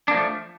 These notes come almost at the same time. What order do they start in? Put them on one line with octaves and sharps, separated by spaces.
D4 A#3 F3 A3